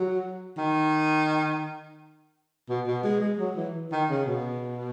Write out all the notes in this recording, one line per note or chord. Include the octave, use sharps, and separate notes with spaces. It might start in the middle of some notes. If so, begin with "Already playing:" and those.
Already playing: F#3
D#3
B2
B2
G#3
G#3
F#3
E3
D#3
C#3
B2